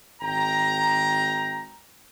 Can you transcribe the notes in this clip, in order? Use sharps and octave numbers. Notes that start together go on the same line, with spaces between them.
G#1 G5 A#5